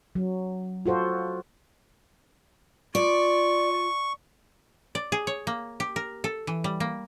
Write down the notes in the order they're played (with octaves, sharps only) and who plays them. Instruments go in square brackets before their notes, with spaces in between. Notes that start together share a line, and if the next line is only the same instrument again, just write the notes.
[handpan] F#3
F4 F#4 A4 C5
[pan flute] F4 [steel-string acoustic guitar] D5 [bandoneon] C#6
[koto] D5
G#4
C#5
A#3
G4
A#4
A4
E3
G3
A#3